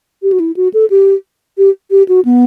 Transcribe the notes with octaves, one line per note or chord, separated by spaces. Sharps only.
G4
F#4
E4
F#4
A4
G4
G4
G4
F#4
B3